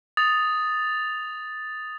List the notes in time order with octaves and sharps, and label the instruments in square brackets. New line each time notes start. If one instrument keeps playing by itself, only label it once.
[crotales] D#6 A6 F7